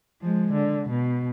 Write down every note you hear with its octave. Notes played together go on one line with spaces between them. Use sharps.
F3 G#3
D3
B2